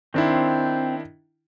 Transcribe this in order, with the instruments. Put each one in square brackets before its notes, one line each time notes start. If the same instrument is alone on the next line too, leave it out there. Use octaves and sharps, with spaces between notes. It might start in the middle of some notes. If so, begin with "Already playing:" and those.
[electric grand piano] D#3 D4 E4 [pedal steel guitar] C4